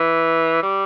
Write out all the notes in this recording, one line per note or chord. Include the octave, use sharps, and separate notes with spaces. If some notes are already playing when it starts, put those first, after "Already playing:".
Already playing: E3
G3